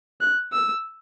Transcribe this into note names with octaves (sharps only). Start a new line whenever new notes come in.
F#6
E6